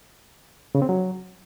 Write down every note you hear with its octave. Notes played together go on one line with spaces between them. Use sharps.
C#3
C4
F#3